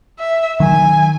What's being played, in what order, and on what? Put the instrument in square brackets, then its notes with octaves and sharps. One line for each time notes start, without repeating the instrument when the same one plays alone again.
[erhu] E5
[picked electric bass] D#3 F#3 [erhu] G#5